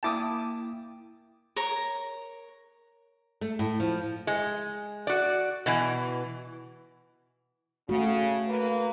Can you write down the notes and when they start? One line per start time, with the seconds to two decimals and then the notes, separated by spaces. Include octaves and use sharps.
0.03 A#3 E4 G5 A5 D6 D#6
1.56 A#4 C#5 A#5
3.41 A3
3.59 A2
3.80 F3
4.27 G#3
5.07 F#4 D5
5.66 B2 E3
7.89 C#3 A3 F#4
8.48 A#3 B4